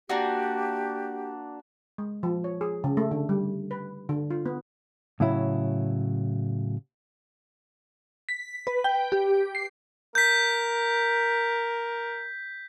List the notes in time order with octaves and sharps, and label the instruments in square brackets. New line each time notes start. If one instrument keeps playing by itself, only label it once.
[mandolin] A#3 D4 F#4 [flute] G4
[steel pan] G#3
F3
C#5
G#4
C#3
A3
D3
G3
B4
D3
F4
B3
[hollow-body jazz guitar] A2 C#3 F#3 E4
[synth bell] B6
B4
G5
G4
C7
[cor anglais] A#4 [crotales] G6 B6